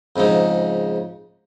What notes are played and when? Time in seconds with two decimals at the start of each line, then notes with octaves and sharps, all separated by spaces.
0.16 F2 G#2 C#3 D#4